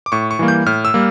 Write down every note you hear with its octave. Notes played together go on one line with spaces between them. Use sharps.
D6
A2 C#6
C#6
E3 G3 A#3
G6
A2 F6
E6
G3 A#3